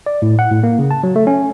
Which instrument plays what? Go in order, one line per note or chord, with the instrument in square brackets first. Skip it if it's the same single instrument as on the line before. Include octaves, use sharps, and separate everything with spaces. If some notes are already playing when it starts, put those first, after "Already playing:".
[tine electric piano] D5
A2
F#5
A2
A#3
C#3
A5
F#3
A3
C#4